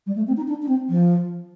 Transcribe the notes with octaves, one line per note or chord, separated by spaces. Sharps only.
G3
A3
C4
D#4
D4
D4
C4
F3